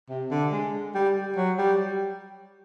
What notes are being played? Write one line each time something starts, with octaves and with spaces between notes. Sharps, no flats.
C3
D3
G#3
G3
F#3
G3